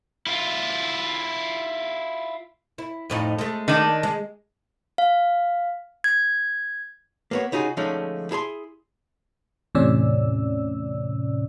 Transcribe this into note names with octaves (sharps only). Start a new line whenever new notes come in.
E4 F4
E4
F2 A2 D#4
G#3 A3
D#3 D4
G#3
F5
G#6
A#3 B3 C#5
C#3 D#4 F4 F#4 G#4
D3 F3 G#3 A3 C#4 D#4
E4 G#4 A5 C6
E2 A2 C3 C#4 D5 E6